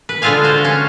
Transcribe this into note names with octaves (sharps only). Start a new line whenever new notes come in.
B4
D3 G#3 F4 A4 F5 G#5
F#4 C5
C#4 F5